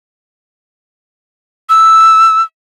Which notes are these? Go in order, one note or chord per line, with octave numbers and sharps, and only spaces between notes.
E6